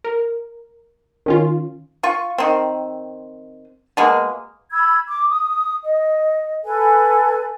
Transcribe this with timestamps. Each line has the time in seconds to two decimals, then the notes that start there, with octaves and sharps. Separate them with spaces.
0.04 A#4
1.26 D#3 C#4 F4
2.03 F4 C#6
2.38 D#3 C4
3.97 B2 G#3 A#3
4.72 B5 E6 G#6
5.08 D6
5.30 D#6
5.84 D#5
6.65 A4 B4 G#5